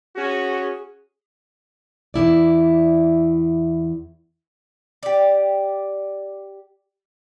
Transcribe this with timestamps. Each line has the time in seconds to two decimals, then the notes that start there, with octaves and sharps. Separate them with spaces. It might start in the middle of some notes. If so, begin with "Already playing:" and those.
0.16 C#4 F#4 G#4
2.14 E2 B2 E4 D5
5.03 G4 D5